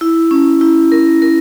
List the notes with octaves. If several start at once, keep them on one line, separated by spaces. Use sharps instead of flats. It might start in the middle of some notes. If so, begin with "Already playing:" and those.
E4
C#4
E4
A#4
A#4